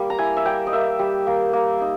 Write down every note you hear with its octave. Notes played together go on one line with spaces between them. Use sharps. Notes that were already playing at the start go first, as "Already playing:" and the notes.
Already playing: G3 A#3
A#5
E4 G#5
E5
G3 G5
D#5
A#3 E5
G3
A#3
A#3
D#4